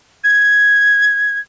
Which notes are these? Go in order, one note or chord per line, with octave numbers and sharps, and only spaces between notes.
G#6